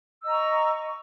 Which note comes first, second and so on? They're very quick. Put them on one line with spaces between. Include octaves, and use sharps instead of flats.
E6 D#5 A#5 C#6